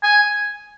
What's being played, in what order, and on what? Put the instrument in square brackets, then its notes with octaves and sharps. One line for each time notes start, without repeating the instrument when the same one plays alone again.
[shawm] G#5